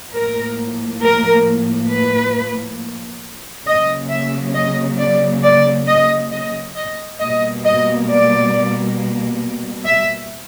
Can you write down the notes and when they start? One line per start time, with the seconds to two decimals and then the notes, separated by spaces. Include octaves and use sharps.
0.13 A2 F3 A#3 A#4
1.02 A#4
1.90 B4
3.66 C#3 F#3 A#3 D#5
4.11 E5
4.55 D#5
4.99 D5
5.43 D5
5.88 D#5
6.32 D#5
6.76 D#5
7.21 B2 G3 A#3 D#5
7.65 D#5
8.09 D5
9.85 E5